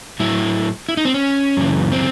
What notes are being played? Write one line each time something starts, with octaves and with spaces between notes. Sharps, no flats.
A2 F#3 E4
E4
D#4
C4
C#4
F#2 C#3 E3
C4